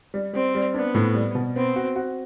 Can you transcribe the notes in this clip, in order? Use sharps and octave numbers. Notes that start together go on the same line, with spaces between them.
G3
G3 C4
G3
B3 D4
A2
G3
B2
B3 C4
F#4
F#4